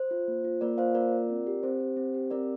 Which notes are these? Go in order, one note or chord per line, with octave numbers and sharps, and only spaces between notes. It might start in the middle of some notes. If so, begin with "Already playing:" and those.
Already playing: C5
F4
A#3
F4
A#3 A#4 D5
F4 C5 F5
A#3 A#4 D5
F4
C4
G4
C4 C5
G4
C4
G4
C4 A#4 D5